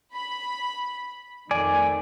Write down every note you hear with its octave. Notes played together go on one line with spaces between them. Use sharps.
B5
F2 D#3 A3 D5 G#5